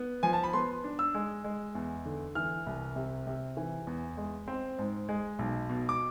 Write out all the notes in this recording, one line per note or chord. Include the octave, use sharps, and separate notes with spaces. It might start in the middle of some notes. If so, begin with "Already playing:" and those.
Already playing: B3
F3 G#5
A5
B5
B3 C6
D4
E6
G#3
G#3
E2
D3
E3 F6
C2
C3
C3
E3
E2
G#3
C4
G#2
G#3
B1
B2
D6